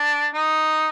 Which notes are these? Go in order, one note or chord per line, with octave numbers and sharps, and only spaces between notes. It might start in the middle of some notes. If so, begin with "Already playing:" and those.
Already playing: D4
D#4